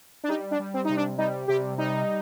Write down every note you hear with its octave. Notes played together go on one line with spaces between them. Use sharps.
D4
G3 D#4
D4
G3
C4
C3 D#4
D4
G3 D#4
C3 G4
G3 D#4